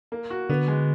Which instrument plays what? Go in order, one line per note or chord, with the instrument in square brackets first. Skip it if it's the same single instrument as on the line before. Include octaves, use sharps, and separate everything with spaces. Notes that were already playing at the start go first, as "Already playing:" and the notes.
[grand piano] A#3
F#4
[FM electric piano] D3 [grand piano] B3
[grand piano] G#3